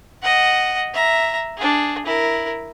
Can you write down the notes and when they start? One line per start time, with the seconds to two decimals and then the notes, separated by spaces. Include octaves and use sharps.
0.22 D#5 F#5
0.93 E5 A#5
1.57 D4 G#4
2.06 E4 A#4